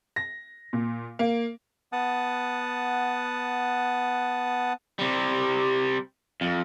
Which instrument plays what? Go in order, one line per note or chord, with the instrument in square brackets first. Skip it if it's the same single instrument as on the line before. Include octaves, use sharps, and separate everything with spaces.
[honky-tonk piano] A#6
A#2
A#3
[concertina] B3 F#5 A5 D#6
[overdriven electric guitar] C3 G3
F2